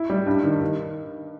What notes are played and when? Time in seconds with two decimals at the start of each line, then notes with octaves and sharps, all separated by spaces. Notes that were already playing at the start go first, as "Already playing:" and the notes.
Already playing: E4
0.10 G3
0.26 G2
0.44 D#3
0.61 D#3